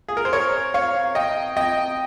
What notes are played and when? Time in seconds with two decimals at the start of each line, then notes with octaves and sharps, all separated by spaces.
0.08 G#4
0.17 A#4
0.25 C5
0.33 A#4 C#5
0.74 C#5 F5
1.15 D#5 G5
1.57 D#5 G5